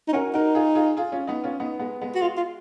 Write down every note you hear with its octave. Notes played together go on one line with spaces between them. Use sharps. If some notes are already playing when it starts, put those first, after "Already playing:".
D#4
C#4 F#4 A#4
D#4 F#4 A#4
F4 G#4
F4 G#4
F4 G#4
C#4 F4
B3 D#4
C#4 F4
B3 D#4
G#3 B3
G#3 B3
F#4
G#3 F4
F4